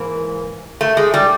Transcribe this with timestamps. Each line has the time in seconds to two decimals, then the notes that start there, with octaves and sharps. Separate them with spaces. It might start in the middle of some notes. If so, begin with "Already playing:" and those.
Already playing: G#2 E3 A#3
0.81 A3
0.97 G#3
1.14 G3